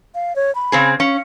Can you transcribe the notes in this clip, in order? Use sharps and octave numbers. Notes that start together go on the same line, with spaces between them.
F5
C#5
B5
C#3 C4 G#4
C#4 F5